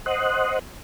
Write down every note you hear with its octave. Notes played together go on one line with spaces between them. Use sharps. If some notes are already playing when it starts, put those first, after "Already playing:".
C5 D#5 F#5